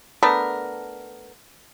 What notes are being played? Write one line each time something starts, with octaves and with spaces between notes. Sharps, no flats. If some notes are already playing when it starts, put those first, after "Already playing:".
A3 B3 D4 A#4